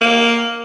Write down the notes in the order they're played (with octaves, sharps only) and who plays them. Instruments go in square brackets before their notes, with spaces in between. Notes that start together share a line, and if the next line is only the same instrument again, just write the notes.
[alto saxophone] A#3